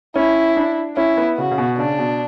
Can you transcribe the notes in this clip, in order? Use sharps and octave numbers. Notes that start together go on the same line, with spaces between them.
C#4 E4
D4
C#4 E4
B3
C#3 F#4
C#3
B2
C#3 D4
B2